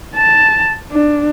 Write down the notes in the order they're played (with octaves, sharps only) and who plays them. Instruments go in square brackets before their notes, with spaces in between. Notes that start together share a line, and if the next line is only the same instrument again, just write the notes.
[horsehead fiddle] A5
D4